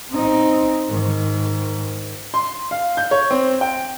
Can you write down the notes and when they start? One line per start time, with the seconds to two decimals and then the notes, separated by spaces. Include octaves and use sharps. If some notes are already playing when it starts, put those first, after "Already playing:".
0.10 C4 D#4
0.89 G#2 D#3
2.34 C6
2.71 F5
2.97 G6
3.11 C#5
3.31 C4
3.61 G5